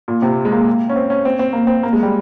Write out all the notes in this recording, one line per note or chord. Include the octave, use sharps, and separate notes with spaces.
A#2
C3
G#3
A#3
C#4
C4
C#4
C4
C4
A#3
C4
A#3
G#3
G3